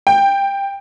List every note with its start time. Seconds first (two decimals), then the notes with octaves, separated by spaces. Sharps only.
0.07 G5